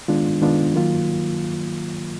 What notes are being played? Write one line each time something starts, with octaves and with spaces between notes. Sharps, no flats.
D#3 G#3 B3 D4 F4
D#3 G#3 B3 D4 F4
D#3 F#3 A#3 F4